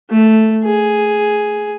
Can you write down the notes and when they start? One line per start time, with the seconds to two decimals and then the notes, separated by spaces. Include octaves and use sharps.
0.10 A3
0.64 G#4